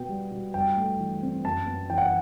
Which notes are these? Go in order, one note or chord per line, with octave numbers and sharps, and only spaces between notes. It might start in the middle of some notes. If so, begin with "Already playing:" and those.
Already playing: B2 B3 G5
G3
B2
G2 G5
A3
E3
C4
F#2 A5
B3
E3 G5
F#5
G5